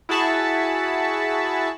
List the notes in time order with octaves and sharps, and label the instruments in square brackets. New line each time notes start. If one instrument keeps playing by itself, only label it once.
[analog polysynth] E4 F#4 G#4 A5 B5 C#6